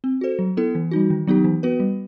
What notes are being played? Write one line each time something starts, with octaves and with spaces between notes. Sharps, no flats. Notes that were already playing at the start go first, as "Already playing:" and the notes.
C4
F#4 A4 C5
F#3
B3 E4 A4
E3
G3 D#4 F#4
D#3
F#3 B3 D#4 G4
E3
B3 F#4 B4
G3